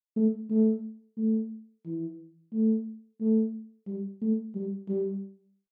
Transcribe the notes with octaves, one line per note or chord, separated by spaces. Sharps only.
A3
A3
A3
E3
A3
A3
G3
A3
G3
G3